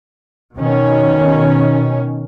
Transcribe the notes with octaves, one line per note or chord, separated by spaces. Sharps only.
B2 D#3 C#4